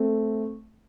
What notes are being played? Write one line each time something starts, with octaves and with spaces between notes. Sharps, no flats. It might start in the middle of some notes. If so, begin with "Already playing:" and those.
Already playing: A3 C4